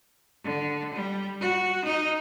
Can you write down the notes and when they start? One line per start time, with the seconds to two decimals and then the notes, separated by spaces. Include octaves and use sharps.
0.44 D3
0.94 G3
1.41 F#4
1.85 D#4